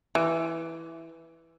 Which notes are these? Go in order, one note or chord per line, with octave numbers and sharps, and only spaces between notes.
E3